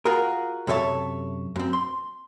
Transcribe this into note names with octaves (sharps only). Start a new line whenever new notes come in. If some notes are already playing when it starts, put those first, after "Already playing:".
F4 F#4 G#4 A#4
F#2 C3 A4 C#5 E5 A5
F#2 C4
C6